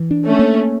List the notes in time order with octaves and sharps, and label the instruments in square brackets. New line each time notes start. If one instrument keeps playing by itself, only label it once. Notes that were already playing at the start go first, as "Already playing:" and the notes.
Already playing: [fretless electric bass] E3
D4
[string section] A3 C#4
[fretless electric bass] A#3